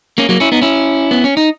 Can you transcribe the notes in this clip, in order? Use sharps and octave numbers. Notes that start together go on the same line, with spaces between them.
A#3 C#4
F#3 A#3
C#4 E4
B3 D#4
C#4 E4
B3
C#4
D#4